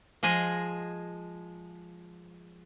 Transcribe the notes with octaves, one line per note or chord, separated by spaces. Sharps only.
F3 G#3 G#4 D#5